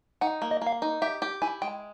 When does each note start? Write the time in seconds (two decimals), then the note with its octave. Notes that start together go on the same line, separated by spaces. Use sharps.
0.21 D#4 F#5
0.42 A#3
0.51 D#5
0.61 A#3
0.67 F5
0.82 D#4
1.02 G4 E5
1.22 G4
1.42 E4 G#5
1.62 G#3 G5